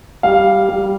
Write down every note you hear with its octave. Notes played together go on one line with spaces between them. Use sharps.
G3 F5
G3